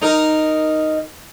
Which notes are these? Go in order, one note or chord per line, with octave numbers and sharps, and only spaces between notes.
D#4 A#4